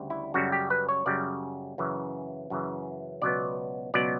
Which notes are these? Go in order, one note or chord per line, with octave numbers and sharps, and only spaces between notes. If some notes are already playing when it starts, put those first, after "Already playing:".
Already playing: D2 C#3 G3
E4
F#2 C#3 G3 F#4
G4
B4
C#5
F#2 C#3 G3 D5
F#2 C#3 E3
F#2 C#3 E3
C#2 B2 F#3 B3 D5
C#2 B2 F#3 B3 D5